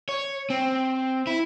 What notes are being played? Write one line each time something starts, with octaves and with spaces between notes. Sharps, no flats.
C#5
C4
E4